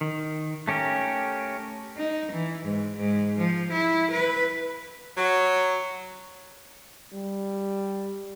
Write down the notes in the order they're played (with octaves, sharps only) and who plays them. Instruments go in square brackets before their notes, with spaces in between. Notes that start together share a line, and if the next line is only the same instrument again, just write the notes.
[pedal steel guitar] D#3
A3 C#4 G4 A#4
[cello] D#4
E3
G#2
G#2
F3
E4
B4
[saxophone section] F#3
[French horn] G3